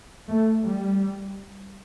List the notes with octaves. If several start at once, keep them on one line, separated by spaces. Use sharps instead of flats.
A3
G3